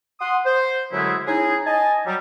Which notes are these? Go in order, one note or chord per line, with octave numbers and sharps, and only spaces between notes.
F#5 C6 D#6
C5
F#2 D3 F#3 G#3 A3 E4
C#4 D#4 E4 G#4
D#5 G#5 A5
F#3 G3